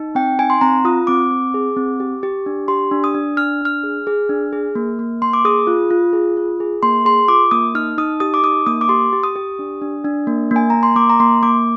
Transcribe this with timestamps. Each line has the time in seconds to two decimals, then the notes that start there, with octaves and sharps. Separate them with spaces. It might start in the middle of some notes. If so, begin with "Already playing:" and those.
Already playing: D#4
0.15 C4 G5
0.39 D#4 G#5
0.50 C6
0.61 C4 A#5
0.85 F4 D#6
1.07 C4 D6
1.31 C4
1.54 G#4
1.76 C4
2.00 G4
2.23 G4
2.46 D4
2.68 G4 C6
2.91 D4
3.04 D#6
3.15 D4
3.37 D4 F6
3.61 D4 F6
3.84 G#4
4.07 G#4
4.29 D4
4.53 G#4
4.75 A#3
4.99 A#3
5.22 A#3 C6
5.33 D6
5.45 G#4 D#6
5.67 F4
5.90 F4
6.13 G#4
6.37 F4
6.60 G#4
6.83 A#3 C6
7.05 G#4 C6
7.28 F4 D6
7.51 A#3 D#6
7.75 D#4 F6
7.98 D#4 D#6
8.20 G4 D#6
8.34 D6
8.43 D#4 D#6
8.66 A#3 D#6
8.81 D6
8.89 G4 C6
9.13 G4
9.23 D#6
9.36 G4
9.59 D4
9.82 D4
10.05 D4
10.27 A#3
10.51 A#3
10.56 G#5
10.70 A#3 A#5
10.83 C6
10.96 A#3 D6
11.10 A#5
11.20 A#3 C6
11.43 A#3 D6